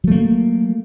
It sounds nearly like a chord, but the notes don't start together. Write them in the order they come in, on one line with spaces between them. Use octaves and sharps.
F#3 A3 A#3